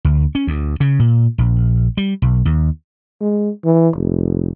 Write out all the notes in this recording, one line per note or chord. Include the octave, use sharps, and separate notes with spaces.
D2
C#4
D2
C#3
A#2
A#1
G3
B1
D#2
G#3
E3
F1